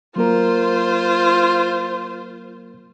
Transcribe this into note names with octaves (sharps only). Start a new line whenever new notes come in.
F#3 A#3 F4 A#4 C5